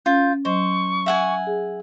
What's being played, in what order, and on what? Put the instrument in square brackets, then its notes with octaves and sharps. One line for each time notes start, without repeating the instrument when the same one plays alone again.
[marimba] C#4 [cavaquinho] F4 [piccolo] G6
[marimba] F#3 D#5 [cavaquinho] C5 [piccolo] C#6
[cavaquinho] E5 F#5 G#5
[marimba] G#4